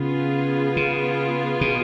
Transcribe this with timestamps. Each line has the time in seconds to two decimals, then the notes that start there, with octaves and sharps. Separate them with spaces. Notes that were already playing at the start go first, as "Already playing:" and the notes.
Already playing: C#3 B3 F4 G#4
0.77 C#3
1.61 B2